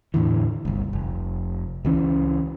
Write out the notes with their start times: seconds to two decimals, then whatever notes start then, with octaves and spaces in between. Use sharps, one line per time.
0.14 E2 A2 D3 E3
0.65 G1 C2
0.93 F1
1.85 C#2 E3 C#4